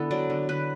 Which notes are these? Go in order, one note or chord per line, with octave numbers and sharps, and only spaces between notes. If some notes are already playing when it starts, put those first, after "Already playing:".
Already playing: D3 B3 E4 A4
F#3 D5
D3
D3 B4